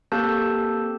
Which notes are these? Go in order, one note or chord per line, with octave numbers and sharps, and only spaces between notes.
A#3 C4 G4 A4 A5 G6